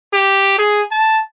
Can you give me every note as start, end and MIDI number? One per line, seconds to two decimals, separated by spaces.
0.13 0.54 67
0.58 0.82 68
0.91 1.20 81